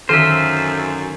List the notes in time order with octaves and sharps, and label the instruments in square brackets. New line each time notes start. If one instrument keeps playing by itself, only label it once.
[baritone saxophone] F#2 [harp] D3 D#3 F5 [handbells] A4 F6 [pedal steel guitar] C5 E5